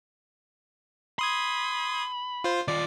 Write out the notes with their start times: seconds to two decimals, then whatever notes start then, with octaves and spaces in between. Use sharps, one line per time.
1.19 B5 C6 D#6 G#6
2.44 F4 C5
2.68 D#3 F4 D5